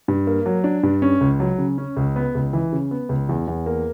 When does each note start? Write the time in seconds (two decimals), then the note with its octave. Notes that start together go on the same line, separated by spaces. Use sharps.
0.08 G2
0.27 A#3
0.46 F#3
0.64 D4
0.83 G2
1.02 C#4
1.21 C#2
1.40 F#3
1.58 C#3
1.78 C#4
1.97 C#2
2.16 B3
2.35 C#2
2.53 E3
2.72 C#3
2.91 B3
3.09 C#2
3.29 E2
3.47 E2
3.66 A#3